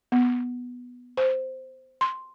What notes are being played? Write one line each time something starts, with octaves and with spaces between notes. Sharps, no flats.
B3
C5
C6